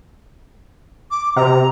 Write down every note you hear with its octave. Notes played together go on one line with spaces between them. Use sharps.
D6
C3 A#5